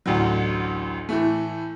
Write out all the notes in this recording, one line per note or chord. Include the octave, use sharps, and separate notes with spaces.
A1 D2 A2 D3 F#3
A2 E3 A3